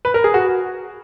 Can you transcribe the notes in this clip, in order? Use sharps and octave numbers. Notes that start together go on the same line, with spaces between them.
B4
A#4
G#4
F#4